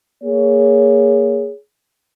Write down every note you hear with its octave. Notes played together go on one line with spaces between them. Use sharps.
A#3 G#4 C#5